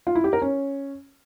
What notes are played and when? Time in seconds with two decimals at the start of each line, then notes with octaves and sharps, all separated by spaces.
0.07 F4
0.15 E4
0.24 G4
0.33 A#4
0.42 C#4